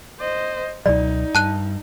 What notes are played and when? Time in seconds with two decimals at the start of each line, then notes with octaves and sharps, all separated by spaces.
0.20 C5 D#5
0.86 C#2 B2 F#3 D#4 D5
1.35 G2 A5 F#6 D#7